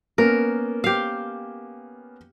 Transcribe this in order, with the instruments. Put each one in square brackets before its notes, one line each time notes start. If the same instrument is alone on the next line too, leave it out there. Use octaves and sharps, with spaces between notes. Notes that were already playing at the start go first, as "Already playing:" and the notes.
[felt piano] A#3 B3 C#4 [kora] A#4
[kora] G4 F5